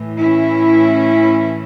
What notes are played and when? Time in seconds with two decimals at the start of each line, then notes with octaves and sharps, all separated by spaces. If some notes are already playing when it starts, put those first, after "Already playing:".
Already playing: A2 E3
0.20 C#4 E4